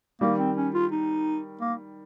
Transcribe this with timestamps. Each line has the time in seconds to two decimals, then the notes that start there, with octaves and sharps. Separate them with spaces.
0.21 D#3 G3 A#3
0.38 C4
0.56 C#4
0.74 F4
0.91 D#4
1.61 A#3